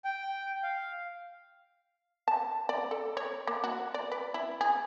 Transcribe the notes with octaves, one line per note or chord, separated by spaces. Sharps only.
G5
F5
A5
D5
A4
C#5
A#3
F#4
D5
B4
E4
G#4